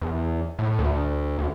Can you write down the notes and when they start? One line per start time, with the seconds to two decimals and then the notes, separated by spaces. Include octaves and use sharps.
0.02 E2
0.59 A2
0.79 D2
1.38 D2